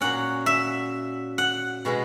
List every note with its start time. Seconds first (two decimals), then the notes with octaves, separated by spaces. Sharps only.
0.01 A#2 F#3 C#4 F#5
0.46 E5
1.38 F#5
1.85 B2 G#3 B3